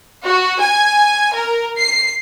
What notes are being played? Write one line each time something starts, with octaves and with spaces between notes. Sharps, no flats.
F#4
G#5
A#4
C7